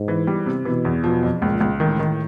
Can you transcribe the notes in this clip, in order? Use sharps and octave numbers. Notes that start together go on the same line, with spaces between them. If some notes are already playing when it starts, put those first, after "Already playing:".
Already playing: G#2
E3
G3
C3
B2 E3
E2
B2 F3
F2
C#2 A#2
C#2
A2 D#3
D#3